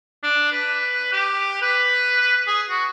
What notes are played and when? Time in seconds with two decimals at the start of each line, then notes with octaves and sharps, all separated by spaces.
0.23 D4
0.52 B4
1.12 G4
1.62 B4
2.47 G#4
2.70 F#4